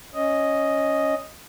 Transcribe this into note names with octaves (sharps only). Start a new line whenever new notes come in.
C#4 D#5